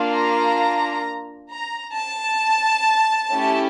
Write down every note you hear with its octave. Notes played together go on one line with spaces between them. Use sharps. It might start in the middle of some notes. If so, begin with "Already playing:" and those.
Already playing: A#3 D4 F4
A#5
A#5
A5
A3 C#4 E4 G4